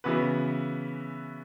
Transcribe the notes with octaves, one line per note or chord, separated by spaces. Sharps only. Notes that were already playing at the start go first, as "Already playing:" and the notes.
C#3 E3 B3 F#4 B4